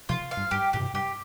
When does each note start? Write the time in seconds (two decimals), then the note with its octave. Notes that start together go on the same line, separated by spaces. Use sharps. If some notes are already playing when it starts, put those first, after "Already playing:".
0.09 C3 F3 F4
0.31 F5
0.37 G2
0.51 G2 G4
0.73 A2 G4
0.79 G2 C3
0.94 G2 G4